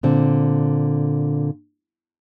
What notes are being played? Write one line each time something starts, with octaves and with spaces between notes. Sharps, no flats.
A#2 D3 C4